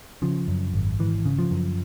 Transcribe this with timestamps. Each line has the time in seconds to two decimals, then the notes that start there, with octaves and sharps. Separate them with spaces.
0.22 C#3 F3
0.48 F#2
0.73 G#1
0.99 G#1 E3
1.26 C#3
1.39 F3
1.51 F#2